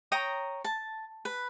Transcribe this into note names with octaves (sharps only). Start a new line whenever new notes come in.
C#5 G5 A#5 D#6
A5
B4